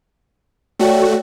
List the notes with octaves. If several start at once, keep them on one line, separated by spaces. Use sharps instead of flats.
A3 F#4 C#5 D5 G5